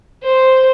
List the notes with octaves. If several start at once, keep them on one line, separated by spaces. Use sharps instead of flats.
C5